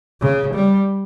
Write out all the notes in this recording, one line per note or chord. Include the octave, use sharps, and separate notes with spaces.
C#3
G3